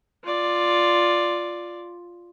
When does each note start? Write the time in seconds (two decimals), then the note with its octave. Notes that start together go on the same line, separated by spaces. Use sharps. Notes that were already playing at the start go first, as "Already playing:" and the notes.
0.24 F4 D5